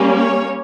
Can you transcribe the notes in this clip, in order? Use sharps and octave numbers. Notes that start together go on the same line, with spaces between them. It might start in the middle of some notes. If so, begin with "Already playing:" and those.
Already playing: G3 A#3 C#4
C#5